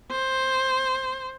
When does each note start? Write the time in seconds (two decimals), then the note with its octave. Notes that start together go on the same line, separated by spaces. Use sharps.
0.11 C5